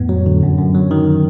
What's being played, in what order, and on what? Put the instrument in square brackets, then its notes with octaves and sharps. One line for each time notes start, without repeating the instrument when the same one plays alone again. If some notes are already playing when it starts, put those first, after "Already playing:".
Already playing: [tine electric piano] F2 A2 B3
F#3
D3
F#2
F#2
F#3
D#3